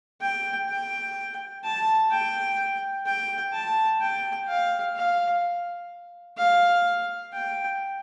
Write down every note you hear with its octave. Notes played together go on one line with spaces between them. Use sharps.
G5
G5
A5
G5
G5
A5
G5
F5
F5
F5
G5